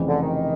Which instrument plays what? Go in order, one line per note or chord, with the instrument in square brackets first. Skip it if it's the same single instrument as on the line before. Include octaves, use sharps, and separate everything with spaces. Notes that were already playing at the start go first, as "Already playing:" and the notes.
Already playing: [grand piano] F1 F2 C#3 E3
[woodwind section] D3
D#3